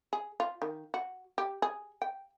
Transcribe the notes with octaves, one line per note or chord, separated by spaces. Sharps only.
G#4
F4
D#3
F#4
G4
G#4
G5